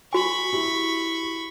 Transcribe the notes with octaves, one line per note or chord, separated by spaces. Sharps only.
F#4 G#5 B5 C#6
E4 G4